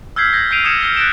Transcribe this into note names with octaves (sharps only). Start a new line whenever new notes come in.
E6 F6 G6 G#6 B6 C7
G6 G#6 A#6
F6 G6 C7 D7 D#7 F7
D#6 F6 G#6 C#7 E7
F6 A#6 C7 G7
F#6 A6 A#6 D7 E7